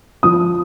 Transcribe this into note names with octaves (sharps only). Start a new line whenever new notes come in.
F3 D#6